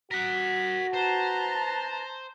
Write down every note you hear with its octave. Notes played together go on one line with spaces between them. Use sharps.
F#4 A#4 F#5 B6
B4 C5 A5 A#5